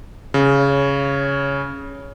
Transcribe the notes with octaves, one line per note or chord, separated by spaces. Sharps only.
C#3
C#5